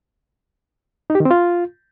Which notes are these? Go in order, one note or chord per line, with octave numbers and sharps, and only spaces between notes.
D#4
G4
D#3
C4
F4